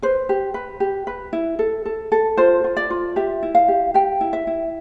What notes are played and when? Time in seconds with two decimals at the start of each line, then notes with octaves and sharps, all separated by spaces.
0.02 B4 C5
0.29 G4
0.54 B4
0.80 G4
1.07 B4
1.33 E4
1.59 A4
1.86 A4
2.12 A4
2.37 F4 C5
2.64 F4
2.77 D5
2.90 F4
3.16 G4 E5
3.43 E4
3.55 F5
3.68 G4
3.94 G4 G5
4.21 E4
4.33 E5
4.47 E4